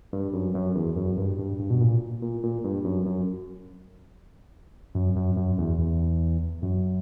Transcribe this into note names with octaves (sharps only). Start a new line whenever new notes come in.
G2
F#2
F#2
E2
F#2
G2
G2
G2
B2
A#2
A#2
A#2
G2
F#2
F#2
F#2
F#2
F#2
E2
E2
F#2